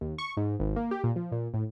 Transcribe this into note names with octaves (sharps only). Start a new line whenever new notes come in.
D#2
C#6
G#2
G#1
A#3
G4
A#2
F3
A#2
A2